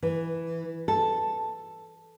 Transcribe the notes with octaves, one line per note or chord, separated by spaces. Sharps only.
E3
A4